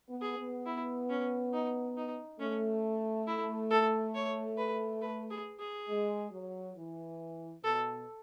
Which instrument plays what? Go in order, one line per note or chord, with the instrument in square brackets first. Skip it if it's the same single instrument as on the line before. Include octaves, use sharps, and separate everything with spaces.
[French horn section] B3
[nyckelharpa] G#4
[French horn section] B3
[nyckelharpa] E4
C#4
D#4
D#4
[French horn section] A3 [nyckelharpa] C#4
[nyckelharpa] E4
A4
C#5
B4
B4
G#4
G#4
[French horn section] G#3
F#3
E3
[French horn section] B2 [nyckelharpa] A4